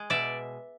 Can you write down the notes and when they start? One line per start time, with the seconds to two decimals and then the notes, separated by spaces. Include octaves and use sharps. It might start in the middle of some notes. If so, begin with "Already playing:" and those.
Already playing: G#3
0.10 B2 D5 E5